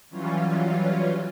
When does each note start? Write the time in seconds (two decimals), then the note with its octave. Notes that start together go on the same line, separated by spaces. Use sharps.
0.10 E3 F#3 G3 C#4 F4